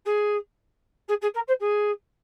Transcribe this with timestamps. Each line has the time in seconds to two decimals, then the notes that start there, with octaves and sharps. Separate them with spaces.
0.05 G#4
1.08 G#4
1.21 G#4
1.34 A#4
1.48 C5
1.60 G#4